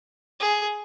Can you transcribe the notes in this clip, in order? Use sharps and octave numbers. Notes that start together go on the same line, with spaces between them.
G#4